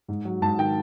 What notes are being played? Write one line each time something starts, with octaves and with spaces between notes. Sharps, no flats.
G#2
F#3
G#2 A5
D#3 G5